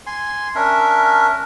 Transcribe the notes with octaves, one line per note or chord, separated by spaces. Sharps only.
G#5 C6
C#4 D4 A#4 E5